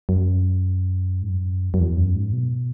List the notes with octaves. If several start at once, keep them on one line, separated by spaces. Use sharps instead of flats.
F#2
G#2
F#2
F#2
E2
F#2
G#2
B2